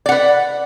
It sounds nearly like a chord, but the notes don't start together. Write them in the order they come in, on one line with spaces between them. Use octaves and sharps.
D5 F#5 B4